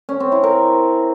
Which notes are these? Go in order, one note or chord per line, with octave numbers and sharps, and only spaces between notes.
C#4
C4
E4
A#4